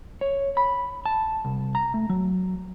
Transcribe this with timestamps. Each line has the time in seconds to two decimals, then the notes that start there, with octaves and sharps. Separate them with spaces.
0.21 C#5
0.57 B5
1.06 A5
1.45 C2
1.75 A#5
1.94 A3
2.09 F#3